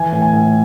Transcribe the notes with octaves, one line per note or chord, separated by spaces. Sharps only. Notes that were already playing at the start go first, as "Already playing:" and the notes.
Already playing: E3 G#5
A2
G#5
A2